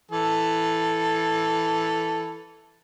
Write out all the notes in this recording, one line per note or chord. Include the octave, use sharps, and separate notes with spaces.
E3 A4